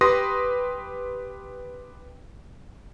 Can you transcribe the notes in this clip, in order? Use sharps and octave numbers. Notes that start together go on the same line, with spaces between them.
G4 B4 C6 D#6 A#6